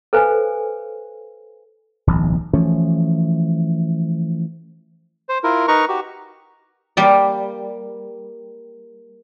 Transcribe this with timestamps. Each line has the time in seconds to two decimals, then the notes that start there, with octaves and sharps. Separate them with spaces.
0.13 A4 B4 C5 F5 G#5
2.07 D1 B1 E3
2.53 E3 F3 A3 C#4
5.29 C5
5.44 E4 F4 A#4
5.68 D#4 A#4 B4 A#5 C#6
5.89 F#4 G4
6.97 G3 A#3 D5